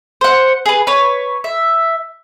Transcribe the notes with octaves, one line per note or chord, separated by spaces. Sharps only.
C5 F#5
G#4 B4
B4 C#5
E5